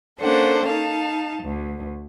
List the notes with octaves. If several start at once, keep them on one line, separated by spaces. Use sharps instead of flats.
A#3 C#4 D4 A4 C5 F#5
D#4 F5 A5
D2